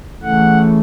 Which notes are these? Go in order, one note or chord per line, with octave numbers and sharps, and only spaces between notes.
C#3 E3 A3 F#5